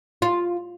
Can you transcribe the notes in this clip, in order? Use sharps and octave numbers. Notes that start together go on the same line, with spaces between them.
F4